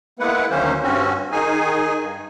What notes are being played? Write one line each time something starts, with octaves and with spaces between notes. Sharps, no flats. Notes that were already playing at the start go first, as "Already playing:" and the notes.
G#3 A#3 B3 E4 B4 F#5
D2 D#3 F#3 A#3 C#4 C5
G2 C4 C#4 F#4
D#3 D#4 G#4 G#5
G2